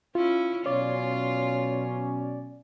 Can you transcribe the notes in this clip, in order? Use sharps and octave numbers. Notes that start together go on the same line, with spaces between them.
C#4 E4 F4
B2 F#3 C#4 F4 C#5 D5